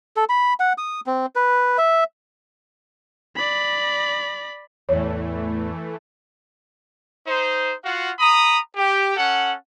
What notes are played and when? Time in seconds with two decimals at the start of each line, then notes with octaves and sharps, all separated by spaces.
0.17 A4
0.29 B5
0.60 F#5
0.78 D#6
1.06 C4
1.36 B4
1.78 E5
3.36 D5 B5
4.89 E2 A2 E3 A3 C#5
7.26 D#4 C5
7.84 F4 F#4 F5 F#5
8.19 A#5 B5 D#6
8.76 G4
9.16 C#4 A4 F#5